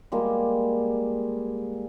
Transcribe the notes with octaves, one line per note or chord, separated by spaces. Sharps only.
G3 G#3 A#3